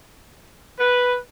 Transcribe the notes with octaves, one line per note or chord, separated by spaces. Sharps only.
B4